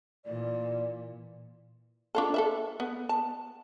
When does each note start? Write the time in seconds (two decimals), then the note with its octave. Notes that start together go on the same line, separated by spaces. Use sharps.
0.25 A#2 E3 D5
2.15 D4 F4 A4
2.34 A4 B4 E5
2.80 B3
3.09 A5